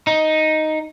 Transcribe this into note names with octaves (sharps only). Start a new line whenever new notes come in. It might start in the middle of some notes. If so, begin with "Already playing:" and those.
D#4